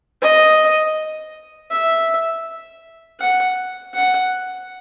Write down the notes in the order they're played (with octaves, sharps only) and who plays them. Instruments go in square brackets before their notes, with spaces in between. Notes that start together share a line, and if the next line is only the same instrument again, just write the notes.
[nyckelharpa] D#5
E5
F#5
F#5